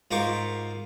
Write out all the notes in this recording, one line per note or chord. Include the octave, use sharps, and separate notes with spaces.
G#2 F4 A#4 G5 C#6 D6